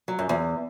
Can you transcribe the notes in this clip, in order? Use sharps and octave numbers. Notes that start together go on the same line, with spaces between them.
F#3
F#2
E2